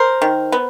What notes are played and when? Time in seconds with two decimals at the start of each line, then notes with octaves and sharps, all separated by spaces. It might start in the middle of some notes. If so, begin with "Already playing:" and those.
Already playing: A#4 C5
0.22 D#3
0.52 B3